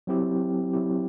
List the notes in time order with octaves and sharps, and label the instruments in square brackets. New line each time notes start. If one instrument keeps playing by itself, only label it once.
[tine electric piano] F#3 C4 E4 G4
F#3 C4 E4 G4